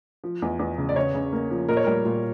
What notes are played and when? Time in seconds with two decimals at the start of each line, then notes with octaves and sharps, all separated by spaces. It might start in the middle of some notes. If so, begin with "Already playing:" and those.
0.24 F3
0.42 E2
0.59 E2
0.78 C#3
0.89 D5
0.96 C#3 C#5
1.15 C#3
1.32 A#3
1.50 F3
1.69 A#2 A#4
1.77 C#5
1.84 G3 A#4
2.05 A#2